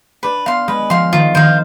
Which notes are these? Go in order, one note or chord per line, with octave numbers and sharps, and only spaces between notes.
D4 B4
B3 F5 C6
G#3 B4
F3 F5 C6
D#3 F4
D#3 C5 F5